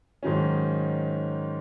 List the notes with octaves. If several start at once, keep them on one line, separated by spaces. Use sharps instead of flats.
G#2 D#3 F#3 C#4